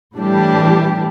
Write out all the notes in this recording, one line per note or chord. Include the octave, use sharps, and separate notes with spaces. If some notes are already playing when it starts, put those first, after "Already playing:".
A2 E3 G3 D4 G4